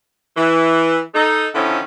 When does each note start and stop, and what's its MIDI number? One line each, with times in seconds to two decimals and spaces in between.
0.37 0.99 52
1.14 1.47 63
1.14 1.47 69
1.54 1.80 50
1.54 1.80 51
1.54 1.80 53
1.54 1.80 61
1.54 1.80 64
1.54 1.80 69